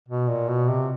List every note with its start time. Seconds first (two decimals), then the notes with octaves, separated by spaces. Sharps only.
0.09 B2
0.29 A#2
0.48 B2
0.69 C3